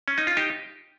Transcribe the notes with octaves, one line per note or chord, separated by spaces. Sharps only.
C#4
D#4
F4
D#4 G4